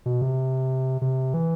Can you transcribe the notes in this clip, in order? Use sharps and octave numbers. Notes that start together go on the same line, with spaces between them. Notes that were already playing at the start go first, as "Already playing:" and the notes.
B2
C3
C3
E3